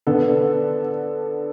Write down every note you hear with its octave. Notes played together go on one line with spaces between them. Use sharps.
D3 B3 A4